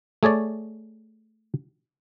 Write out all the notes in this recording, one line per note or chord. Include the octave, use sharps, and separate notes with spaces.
A3 G#4 C#5 D5